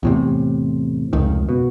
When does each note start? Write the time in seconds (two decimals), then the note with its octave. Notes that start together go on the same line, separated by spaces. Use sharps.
0.03 E2 A2 C3
1.13 F1 C#2 D#3
1.49 B2